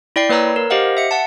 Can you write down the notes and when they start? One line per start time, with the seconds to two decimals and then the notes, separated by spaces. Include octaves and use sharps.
0.16 E4 D5 G5 C7
0.29 A#3 B4 C#5 A#5 E6
0.56 A#4
0.70 G4 C5 D#5 F5 F#5
0.97 E5 C#7
1.11 F#5 A5